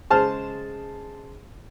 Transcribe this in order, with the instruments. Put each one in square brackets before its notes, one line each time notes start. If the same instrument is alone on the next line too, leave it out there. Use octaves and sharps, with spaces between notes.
[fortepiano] C#3 G#3 G#4 C5 A5 F6